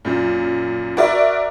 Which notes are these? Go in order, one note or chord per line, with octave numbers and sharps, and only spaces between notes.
F#2 A#2
F#4 A#4 D5 E5